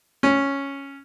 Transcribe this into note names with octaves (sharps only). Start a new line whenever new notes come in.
C#4